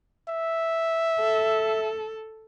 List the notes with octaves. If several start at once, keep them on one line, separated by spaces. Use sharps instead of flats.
E5
A4